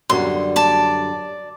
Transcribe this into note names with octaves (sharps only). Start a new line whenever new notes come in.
F#2 D3 G3 C6
D5 A5